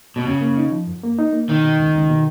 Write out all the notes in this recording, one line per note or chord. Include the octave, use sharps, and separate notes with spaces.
B2
F#2 C#3
A#3
D#4
F3
F#2
A#3
D#4
A#3
B2 D#3
B2
C#2
C#2
B2